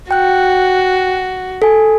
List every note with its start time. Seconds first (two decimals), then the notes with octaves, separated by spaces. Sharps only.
0.11 F#4 G5 F#6
1.62 A4 G#5